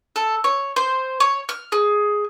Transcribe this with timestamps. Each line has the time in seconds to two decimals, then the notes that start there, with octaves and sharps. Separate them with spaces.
0.16 A4
0.44 C#5
0.76 C5
1.20 C#5
1.49 F6
1.72 G#4